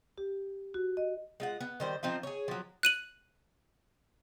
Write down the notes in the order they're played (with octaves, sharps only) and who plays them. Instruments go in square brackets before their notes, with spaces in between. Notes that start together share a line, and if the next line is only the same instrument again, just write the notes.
[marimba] G4
F#4
D#5
[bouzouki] G#3 F4 F#5
B3
D#3 G3 C5
F3 C4 D#4 F4
G#4 C#5
F3 F#3
[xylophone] F#6 D#7 F#7